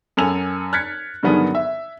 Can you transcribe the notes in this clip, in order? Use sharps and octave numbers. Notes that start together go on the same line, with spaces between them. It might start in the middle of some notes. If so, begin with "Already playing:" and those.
F#2 A4 G#5 F7
F6 F#6 G#6 A6 B6 C#7
G2 D3 D#3 F#3 B3 G#4
E5